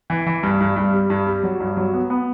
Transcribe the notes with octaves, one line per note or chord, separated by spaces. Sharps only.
E3
E3
G2
G2
G2
G3
G2
G3
F#3
G2
F#3
B3
B3